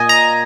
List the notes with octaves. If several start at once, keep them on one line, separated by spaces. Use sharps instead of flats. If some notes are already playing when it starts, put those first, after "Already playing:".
Already playing: A#2 A#3 D#5 G#5
A#5